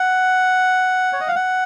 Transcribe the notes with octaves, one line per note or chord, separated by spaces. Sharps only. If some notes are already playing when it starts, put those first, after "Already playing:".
Already playing: F#5
C#5
D#5
F5
F#5